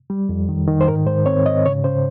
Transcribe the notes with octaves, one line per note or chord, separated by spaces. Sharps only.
G3
F2
D#3
D#3
C5
G#2 A#4
G#2 C5
C4 C#5
G#2 D#5
C#3 C#5
C#3 C5